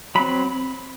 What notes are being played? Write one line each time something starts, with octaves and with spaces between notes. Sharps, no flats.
F#3 C4 B5